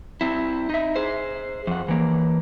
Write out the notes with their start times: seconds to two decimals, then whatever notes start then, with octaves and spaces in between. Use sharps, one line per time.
0.21 C4 E4
0.70 D#4 E5
0.96 G#4 C5
1.67 F2 F#5
1.88 E3 A#3